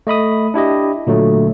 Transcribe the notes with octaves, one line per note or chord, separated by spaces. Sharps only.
A3 D#5 B5 D#6
D4 E4 G4 D#5
A#2 D3 F#3 A3